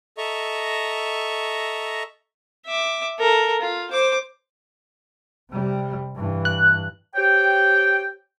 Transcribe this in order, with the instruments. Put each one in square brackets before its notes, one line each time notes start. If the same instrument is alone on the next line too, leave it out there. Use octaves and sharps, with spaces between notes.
[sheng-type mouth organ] A4 D#5 E5 A#5 C#6
[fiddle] E5 D6
A4 A#4
F4
C5 D6
[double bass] C3 G3
G2 E3
[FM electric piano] F#6
[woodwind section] G4 C5 C#5 G5